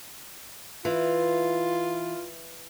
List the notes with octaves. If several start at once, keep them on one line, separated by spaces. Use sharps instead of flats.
E3 F4